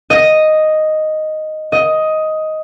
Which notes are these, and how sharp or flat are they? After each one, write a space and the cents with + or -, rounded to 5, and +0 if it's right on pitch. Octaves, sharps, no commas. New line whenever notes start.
D#5 +0
D#5 +10